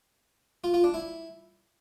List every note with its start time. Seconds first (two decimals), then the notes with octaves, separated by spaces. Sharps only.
0.64 F4
0.74 F4
0.84 D4
0.94 E4